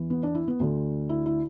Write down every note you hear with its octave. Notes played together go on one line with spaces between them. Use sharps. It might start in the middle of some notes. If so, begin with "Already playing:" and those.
Already playing: E2 E3
B3
D4
E4
B3
D2 D3
E4
E4